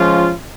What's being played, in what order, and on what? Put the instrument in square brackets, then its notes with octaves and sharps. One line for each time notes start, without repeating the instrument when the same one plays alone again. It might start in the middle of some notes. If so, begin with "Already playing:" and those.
Already playing: [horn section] F3 G#3 C#4 F4